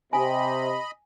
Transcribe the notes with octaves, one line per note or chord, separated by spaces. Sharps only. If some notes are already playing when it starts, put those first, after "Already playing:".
C3 D#5 G#5 B5